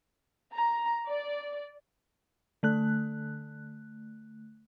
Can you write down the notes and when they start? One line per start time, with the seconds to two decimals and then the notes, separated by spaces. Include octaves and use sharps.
0.55 A#5
1.07 D5
2.63 D3 A3 F#6